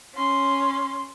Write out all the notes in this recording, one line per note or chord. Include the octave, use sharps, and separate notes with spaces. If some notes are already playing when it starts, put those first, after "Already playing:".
C#4 C6